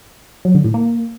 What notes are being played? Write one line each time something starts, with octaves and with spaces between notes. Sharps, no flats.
F#3
D3
A2
A#3